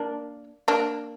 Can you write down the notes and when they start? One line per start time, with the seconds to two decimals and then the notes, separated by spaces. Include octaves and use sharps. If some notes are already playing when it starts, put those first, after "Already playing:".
Already playing: A#3 D4
0.68 A#3 D4